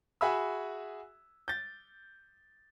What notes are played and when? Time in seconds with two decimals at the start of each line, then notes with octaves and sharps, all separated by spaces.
0.21 F#4 G#4 E5 G#5 B5 E6
1.48 G6 A6